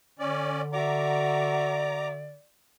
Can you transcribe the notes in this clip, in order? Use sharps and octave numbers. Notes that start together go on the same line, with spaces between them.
D3 C#4 D5
F#4 D5 E5 A#5 D6